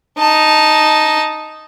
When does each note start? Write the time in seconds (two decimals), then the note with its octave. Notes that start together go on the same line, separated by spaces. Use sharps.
0.19 D#4 A5